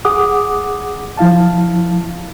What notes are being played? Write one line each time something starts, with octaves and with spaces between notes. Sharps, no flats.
G#4 F#5 D6 D#6
F3 E4 F5 A5